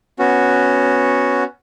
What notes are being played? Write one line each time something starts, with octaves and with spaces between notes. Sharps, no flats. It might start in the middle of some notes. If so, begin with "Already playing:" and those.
B3 C#4 F#4